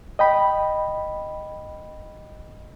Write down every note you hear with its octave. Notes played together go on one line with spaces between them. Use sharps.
D#5 G5 B5